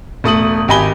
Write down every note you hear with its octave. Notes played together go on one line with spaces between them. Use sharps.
E1 A3 D#6 F#7
G#1 G4 D#5 G#5 B5 G7